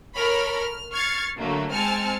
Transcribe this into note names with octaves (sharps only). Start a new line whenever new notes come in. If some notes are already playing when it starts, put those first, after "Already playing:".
A4 A#4 C#5 B5 F6
F6
C#6 F6 G#6 A6 C7 C#7
D3 F#3 A3 A#3
G#3 C4 G#5 A5 F6 C#7